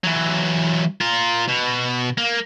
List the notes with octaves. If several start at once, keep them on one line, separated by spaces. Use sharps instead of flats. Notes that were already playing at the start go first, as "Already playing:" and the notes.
E3 F#3
F4 A#4
B2
A#3